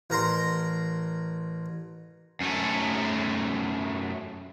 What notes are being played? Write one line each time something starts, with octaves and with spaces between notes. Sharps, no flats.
A1 A#4 A#5 C6
F#2 A3